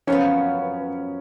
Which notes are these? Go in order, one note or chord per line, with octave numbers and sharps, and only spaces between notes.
F#2 F3 B3 C#4